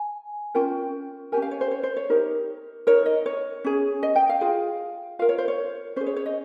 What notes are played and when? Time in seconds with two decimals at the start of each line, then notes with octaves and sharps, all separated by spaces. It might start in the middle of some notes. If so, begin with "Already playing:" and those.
Already playing: G#5
0.54 C#4 F4 A#4 G5
1.32 C#4 G4 A#4 G#5
1.42 F5
1.51 C#5
1.61 C5
1.71 C#5
1.83 C5
1.96 C#5
2.10 D#4 G4 A#4
2.87 D#4 A#4 C#5
3.06 D#5
3.26 C#5
3.64 C#4 G#4
4.03 D#5
4.16 G5
4.29 F5
4.41 F4 G#4
5.19 F4 A#4 F5
5.29 C#5
5.38 C5
5.48 C#5
5.96 C#4 G#4 C5
6.06 C#5
6.16 C#5
6.26 D#5